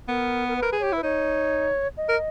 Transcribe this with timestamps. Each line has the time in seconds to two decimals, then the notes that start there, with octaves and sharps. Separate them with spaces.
0.08 B3 A#4
0.48 A#4
0.56 B4
0.63 A#4
0.73 G#4
0.80 G4 C#5
0.93 E4 B4
1.03 D#4 C#5
1.97 D#5
2.09 A#4